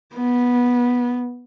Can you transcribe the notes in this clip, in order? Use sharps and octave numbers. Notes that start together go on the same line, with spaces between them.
B3